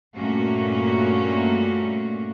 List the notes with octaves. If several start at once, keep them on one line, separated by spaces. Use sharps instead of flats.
G2 A#2 A3 A#3 C#4 F#4